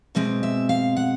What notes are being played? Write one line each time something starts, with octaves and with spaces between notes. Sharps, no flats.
B2 G#3 C4 E5
E5
F5
F#5